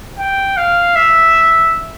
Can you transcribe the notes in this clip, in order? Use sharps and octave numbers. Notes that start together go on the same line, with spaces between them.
G5
F5
E5